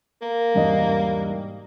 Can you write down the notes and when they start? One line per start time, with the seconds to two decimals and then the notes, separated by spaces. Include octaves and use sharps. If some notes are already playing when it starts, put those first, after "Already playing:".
0.21 A#3 A#4
0.54 E1 G#2 G3 D#5